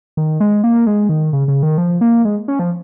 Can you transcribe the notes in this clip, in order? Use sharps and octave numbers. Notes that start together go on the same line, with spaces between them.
D#3
G#3
A#3
G#3
D#3
C#3
C#3
D#3
F3
A#3
G#3
C#4
F3